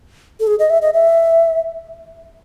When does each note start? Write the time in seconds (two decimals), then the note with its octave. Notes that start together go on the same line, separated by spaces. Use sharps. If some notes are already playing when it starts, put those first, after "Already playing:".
0.40 A4
0.47 G#4
0.59 D#5
0.70 E5
0.82 D#5
0.94 E5